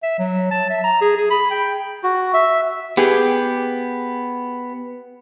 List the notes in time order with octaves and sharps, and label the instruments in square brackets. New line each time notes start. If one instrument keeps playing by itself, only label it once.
[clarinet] E5
F#3
A5
E5
A#5
G#4
G#4
B5
G5
[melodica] F#4
E5
[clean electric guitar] B3 [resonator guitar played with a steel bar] G4 G#4